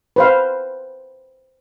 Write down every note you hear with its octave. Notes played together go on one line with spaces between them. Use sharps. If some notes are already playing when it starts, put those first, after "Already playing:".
B4 C5 F5